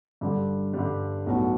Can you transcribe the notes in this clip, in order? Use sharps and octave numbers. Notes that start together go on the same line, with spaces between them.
G2 D3 G3
G2 D3 G3
B1 A2 F#3 B3 F#4